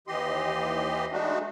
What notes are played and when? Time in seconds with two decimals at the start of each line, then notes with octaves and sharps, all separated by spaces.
0.08 D#2 E3 G4 D#5 C6
1.12 G#3 A3 D4 D#4 F#4